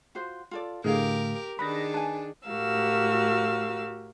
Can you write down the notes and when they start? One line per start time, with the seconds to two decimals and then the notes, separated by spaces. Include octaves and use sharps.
0.15 F4 F#4 C5
0.51 F4 A4 D5
0.84 A2 D3 A3 G4 G#4 A#4 D#5 F5
1.59 D#3 D4 D#4 G#4 A#4 B4 B5 A#6
1.94 B4 G#5 A5
2.48 A2 F#4 G4 A#4 F5 E6